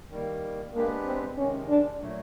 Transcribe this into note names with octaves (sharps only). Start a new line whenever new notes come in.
D#3 G3 A#3
G#3 A#3 B3 D4 G4 B4
C4
C3 D#3 G#3 C#4
D4
A#2 F#3 A3